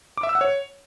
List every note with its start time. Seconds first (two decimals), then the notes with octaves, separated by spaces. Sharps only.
0.17 D6
0.23 E5
0.29 E6
0.35 F#5
0.41 C#5